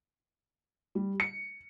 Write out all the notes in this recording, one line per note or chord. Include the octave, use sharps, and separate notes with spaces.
G3
C#7